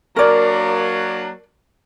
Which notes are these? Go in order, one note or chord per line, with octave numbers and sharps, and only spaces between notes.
F#3 A#3 D4 A#4 D5